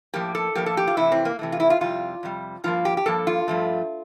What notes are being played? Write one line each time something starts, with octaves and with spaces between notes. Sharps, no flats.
A2 F3 A#3 G4
A4
A2 F3 A#3 G4
A4
G4
F4
C3 E3 A3 E4
C4
A#3
C3 E3 A3
F4
E4
F4
F2 C3 G3 F4
F2 C3 G3
G2 F3 A#3 F4
G4
G4
G2 F3 A#3 A4
F4
G2 F3 A3